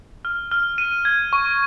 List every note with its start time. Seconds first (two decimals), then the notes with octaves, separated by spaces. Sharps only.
0.25 F6
0.51 F6
0.78 D#7
1.05 G#6
1.33 C#6